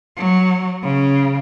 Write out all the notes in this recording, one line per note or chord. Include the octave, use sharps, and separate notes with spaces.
F#3
C#3